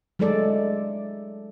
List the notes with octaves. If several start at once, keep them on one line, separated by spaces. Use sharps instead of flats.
F#3 G#3 A3 A4 D5